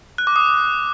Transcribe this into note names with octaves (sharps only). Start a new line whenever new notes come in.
F#6
D6
D#6